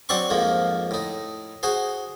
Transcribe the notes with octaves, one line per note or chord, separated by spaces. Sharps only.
F#3 C4 D5 C6 C#6
F2 G#2 F3 A#3
A2 D#4
F#4 G#4 C5